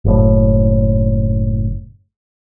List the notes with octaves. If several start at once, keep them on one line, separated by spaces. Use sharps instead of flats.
F#1 A2